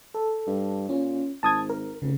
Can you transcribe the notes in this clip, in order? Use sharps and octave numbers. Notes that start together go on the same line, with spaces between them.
A4
G2
A#2 C#4
G#1 A5 D#6 G#6
A#4
F1 C#3